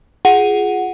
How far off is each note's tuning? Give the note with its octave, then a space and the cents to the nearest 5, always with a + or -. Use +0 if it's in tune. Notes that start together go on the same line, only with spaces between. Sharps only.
F4 +0 G#4 +0 F#5 +0